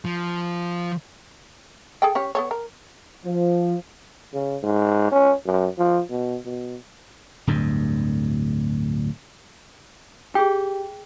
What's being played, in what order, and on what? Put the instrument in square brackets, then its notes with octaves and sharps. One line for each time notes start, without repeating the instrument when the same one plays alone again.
[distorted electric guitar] F3
[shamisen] G#4 A4 G5
C#4 G4 C#5
B3 A4 C#5
A#4
[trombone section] F3
[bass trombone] C#3
G#2
C#4
F#2
F3
B2
B2
[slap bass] D1 D2 G2
[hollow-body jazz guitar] G4 [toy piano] G#4 G5